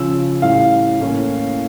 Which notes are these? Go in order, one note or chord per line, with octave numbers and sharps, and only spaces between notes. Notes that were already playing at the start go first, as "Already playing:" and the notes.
Already playing: C#3 F3 C#4 E6
A2 G3 C#4 F5
A2 E3 A#3 C#4